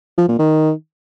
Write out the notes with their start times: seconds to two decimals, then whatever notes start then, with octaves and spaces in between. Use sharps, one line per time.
0.18 F3
0.28 A#2
0.39 D#3